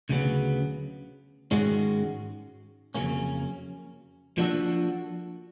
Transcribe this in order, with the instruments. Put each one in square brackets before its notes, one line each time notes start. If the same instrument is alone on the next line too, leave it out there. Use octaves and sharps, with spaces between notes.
[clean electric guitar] D2 C#3 F#3 B3
G#2 D#3 G#3 C#4 F#4
F2 C#3 F#3 A#3 C#4
F3 A#3 D4 F#4 A4